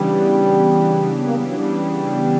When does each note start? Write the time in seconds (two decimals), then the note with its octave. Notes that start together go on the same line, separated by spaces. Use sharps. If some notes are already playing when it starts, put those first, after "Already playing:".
Already playing: C#3 E3 G3 B3 D4 G4
1.24 A#3
1.34 G3
1.45 F#3
1.54 G3